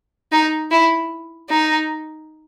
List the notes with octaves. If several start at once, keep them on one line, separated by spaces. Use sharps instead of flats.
D#4
E4
D#4